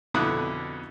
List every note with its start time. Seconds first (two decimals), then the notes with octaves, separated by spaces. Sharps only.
0.14 F2 B2 D3 E4 D#6 F#6